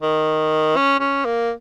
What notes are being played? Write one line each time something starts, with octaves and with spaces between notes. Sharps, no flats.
D#3
C#4
C#4
A#3